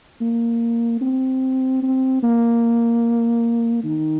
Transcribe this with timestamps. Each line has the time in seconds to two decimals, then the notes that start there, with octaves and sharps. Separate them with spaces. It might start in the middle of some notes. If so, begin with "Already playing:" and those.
0.21 A#3
1.01 C4
1.82 C4
2.23 A#3
3.84 D#3